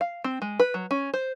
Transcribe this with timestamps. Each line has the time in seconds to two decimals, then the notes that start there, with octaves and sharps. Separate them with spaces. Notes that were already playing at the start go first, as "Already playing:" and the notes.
0.01 F5
0.24 C4
0.42 G#3
0.60 B4
0.74 F#3
0.91 C#4
1.14 C5